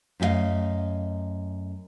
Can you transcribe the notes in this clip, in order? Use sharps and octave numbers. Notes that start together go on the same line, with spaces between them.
F#2 A3 G4 D#5 F5